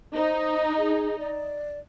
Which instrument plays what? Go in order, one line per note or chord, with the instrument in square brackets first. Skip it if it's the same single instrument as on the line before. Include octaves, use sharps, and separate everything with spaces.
[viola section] D#4 [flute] C5
[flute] G#4
D5